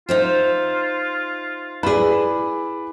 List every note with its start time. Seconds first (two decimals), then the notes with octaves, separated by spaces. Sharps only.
0.09 D#4 F4 C5 E5
1.83 E4 G#4 B4 D5